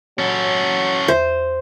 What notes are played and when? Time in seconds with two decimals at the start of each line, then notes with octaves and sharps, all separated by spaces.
0.19 F#3 C#4 A4 C#5
1.08 E2 C5 E5